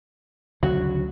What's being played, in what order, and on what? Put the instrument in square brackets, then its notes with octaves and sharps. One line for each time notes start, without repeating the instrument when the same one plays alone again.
[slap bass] D2 C#3 F#3 [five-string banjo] F#4